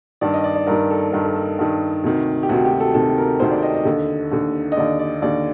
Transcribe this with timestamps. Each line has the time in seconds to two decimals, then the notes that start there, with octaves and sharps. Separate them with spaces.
0.21 G2 D#3 D5
0.34 D#5
0.44 D5
0.55 D5
0.67 G2 D#3 A#4
0.91 A4
1.12 G2 D#3 A#4
1.24 A4
1.36 A4
1.59 G2 D#3
2.04 D2 C3 D#3
2.43 G4
2.49 D2 C3 D#3 F#4
2.65 G4
2.80 A4
2.94 D2 C3 D#3 A4
3.18 A#4
3.40 D2 C3 D#3 C5
3.51 D5
3.63 D#5
3.75 D#5
3.85 D#2 D3
4.32 D#2 D3
4.72 D#5
4.77 D#2 D3 D5
4.99 D5
5.22 D#2 D3 D5